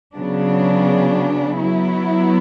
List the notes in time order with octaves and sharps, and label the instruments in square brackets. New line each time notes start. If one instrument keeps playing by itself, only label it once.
[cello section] C#3 F#3 B3 D4
F#3 B3 E4